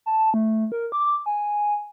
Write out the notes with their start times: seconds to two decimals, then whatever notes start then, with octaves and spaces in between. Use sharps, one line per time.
0.06 A5
0.34 A3
0.72 A#4
0.92 D6
1.26 G#5